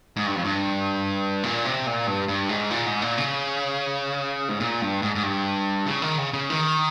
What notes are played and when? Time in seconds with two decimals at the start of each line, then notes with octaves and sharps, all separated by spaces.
0.17 G#2
0.26 G2
0.36 F2
0.45 G2
1.43 A#2
1.65 C3
1.86 A#2
2.07 G2
2.28 G2
2.49 G#2
2.71 A#2
2.86 G#2
3.02 A#2
3.18 C#3
4.49 G#2
4.60 A#2
4.82 G2
5.02 G#2
5.15 G#2
5.23 G2
5.86 C#3
6.02 D#3
6.18 C#3
6.34 C#3
6.50 D#3